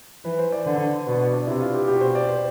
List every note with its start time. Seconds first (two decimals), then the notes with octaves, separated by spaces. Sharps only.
0.25 E3 B4
0.39 C5
0.52 D5
0.66 D3
1.07 B2 B4
1.20 D4
1.33 D4
1.47 C3 E4
1.61 F4
1.74 G4
1.88 B2 G4
2.01 C5
2.15 D5
2.29 C5